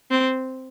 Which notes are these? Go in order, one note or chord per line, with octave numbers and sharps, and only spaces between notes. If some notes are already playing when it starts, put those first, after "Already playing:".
C4